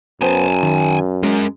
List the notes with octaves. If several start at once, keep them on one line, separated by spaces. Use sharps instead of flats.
F#2 B3 C5 G#5 A5
D#3
G#3 C#4 A#4